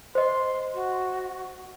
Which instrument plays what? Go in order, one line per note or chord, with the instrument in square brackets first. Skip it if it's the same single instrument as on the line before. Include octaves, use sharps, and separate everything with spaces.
[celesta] C5 D#5 [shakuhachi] C6
[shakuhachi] F#4